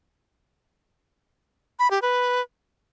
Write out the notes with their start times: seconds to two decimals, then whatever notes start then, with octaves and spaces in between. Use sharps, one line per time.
1.79 B5
1.91 G4
2.02 B4